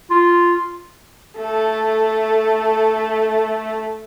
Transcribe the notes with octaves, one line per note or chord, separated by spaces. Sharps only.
F4
A3 A4